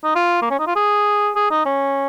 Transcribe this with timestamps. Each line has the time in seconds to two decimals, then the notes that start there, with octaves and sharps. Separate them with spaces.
0.04 D#4
0.15 F4
0.42 A#3
0.50 C#4
0.59 D#4
0.67 F4
0.76 G#4
1.36 G#4
1.51 D#4
1.65 C#4